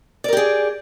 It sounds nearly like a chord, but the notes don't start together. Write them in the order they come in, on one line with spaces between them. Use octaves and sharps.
D5 A#4 G4 G#4